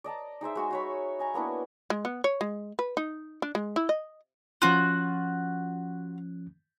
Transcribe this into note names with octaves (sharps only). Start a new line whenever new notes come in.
D5 D#5 A5 A#5
D#4 G#4 C5 E5
G#3 F#4 G#5
F#4 C#5 B5
D#5 G#5 A#5
A#3 B3 D4 E4
G#3
B3
C#5
G#3
B4
D#4
D4
G#3
E4
D#5
F3 C#4 F4 F#4 F#6